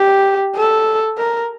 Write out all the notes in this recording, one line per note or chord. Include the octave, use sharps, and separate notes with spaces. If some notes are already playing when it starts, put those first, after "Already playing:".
Already playing: G4
A4
A#4